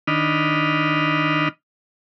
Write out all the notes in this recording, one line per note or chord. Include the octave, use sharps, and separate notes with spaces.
D#3 D4 D#5 B5 F6